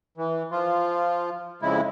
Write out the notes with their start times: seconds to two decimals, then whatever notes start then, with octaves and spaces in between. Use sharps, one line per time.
0.18 E3
0.51 F3 F4
1.62 F2 C#3 G#3 E4